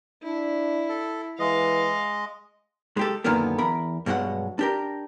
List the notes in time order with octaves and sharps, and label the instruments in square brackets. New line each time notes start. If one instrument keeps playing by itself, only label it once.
[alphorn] D4 [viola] E4
[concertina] A4
[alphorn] E3 [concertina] G#3 D#5 [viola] F5
[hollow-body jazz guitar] G#3 G4 A4
F#2 A#2 D3 D#3 A#3 B3
E2 A#4 B5
G2 B2 F#3 G#3 F#5
D4 G4 A#4